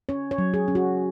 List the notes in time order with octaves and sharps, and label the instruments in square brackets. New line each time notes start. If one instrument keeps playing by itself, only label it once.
[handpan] C#4 C#5
C#5
F#3
G#4
C#4
F#4